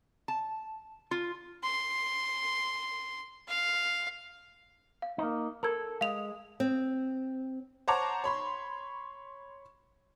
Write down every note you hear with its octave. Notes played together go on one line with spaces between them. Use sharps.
A5
F4
C6
F5
F5
A#3 D#4
A4 A#4 G#6
G#3 F5 F7
C4
C5 C#5 F#5 A5 A#5 D6
C#5 B5 C6